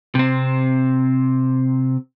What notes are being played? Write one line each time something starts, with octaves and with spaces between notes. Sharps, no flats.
C3 C4